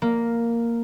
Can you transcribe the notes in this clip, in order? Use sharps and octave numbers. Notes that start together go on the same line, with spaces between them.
A#3